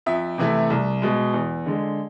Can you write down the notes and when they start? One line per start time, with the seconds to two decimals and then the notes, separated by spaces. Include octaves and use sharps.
0.06 F2 E5
0.38 C3 E3 A3 E4
0.70 C2
1.02 B2 G#3
1.34 E2
1.66 D3 G#3